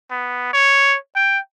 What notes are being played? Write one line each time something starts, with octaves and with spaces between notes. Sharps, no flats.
B3
C#5
G5